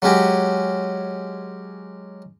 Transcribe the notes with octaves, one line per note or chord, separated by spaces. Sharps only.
F#3 G#3 C#4 F#4 G4